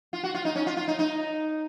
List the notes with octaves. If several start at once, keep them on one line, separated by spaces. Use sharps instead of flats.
F4
F#4
F4
D#4
C#4
F4
F4
D#4
D#4